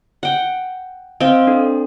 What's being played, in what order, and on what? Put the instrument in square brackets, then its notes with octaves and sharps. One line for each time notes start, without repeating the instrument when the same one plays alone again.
[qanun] F#5 G5
[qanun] C4 G5 [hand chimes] D#5 F5
[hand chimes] D4 A4